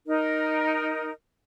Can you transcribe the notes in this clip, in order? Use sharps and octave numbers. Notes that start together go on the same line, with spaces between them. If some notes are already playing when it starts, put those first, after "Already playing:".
D#4 A#4